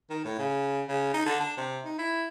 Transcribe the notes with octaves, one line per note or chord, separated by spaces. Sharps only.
D#3
A2
C#3
C#3
D#4
D3
D4
C3
D#4
E4